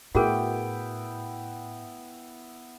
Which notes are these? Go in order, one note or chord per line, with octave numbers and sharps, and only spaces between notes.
A2 B3 E4 F#4 G#4 A#4 G5